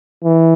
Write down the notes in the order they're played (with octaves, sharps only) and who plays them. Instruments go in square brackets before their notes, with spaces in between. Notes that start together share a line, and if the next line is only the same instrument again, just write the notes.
[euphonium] E3